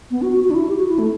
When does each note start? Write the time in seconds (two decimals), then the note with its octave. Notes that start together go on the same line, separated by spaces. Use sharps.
0.11 B3
0.22 F#4
0.32 F#4
0.44 F#4
0.50 D4
0.54 E4
0.69 G4
0.76 F#4
0.88 E4
0.99 A3